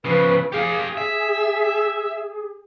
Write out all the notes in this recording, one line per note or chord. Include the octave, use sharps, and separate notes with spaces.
C#3 F3 B4
G4 G#4 F5
E5